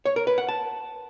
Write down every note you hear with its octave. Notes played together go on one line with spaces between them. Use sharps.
C#5
A#4
B4
F#5
A5